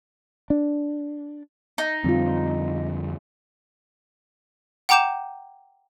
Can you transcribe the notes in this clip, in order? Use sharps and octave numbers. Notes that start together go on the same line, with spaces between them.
D4
D#4
F2 D3 G3 C4 F4
F#5 G5 A#5 D6 G6 E7